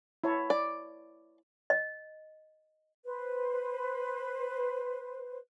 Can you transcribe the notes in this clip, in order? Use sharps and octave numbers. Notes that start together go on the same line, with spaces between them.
E4 C#5 A5
D5
D#5
B4 C5